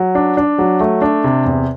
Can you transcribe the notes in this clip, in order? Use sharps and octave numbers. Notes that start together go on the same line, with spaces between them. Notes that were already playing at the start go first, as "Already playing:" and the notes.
Already playing: F#3
D4
D4
F#3
A3
D4
C3
E2